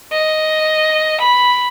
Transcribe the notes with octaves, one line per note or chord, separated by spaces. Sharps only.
D#5
B5